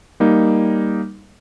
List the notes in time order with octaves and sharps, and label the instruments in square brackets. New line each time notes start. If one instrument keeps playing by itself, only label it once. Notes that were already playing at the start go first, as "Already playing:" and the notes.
[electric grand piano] G3 A#3 D#4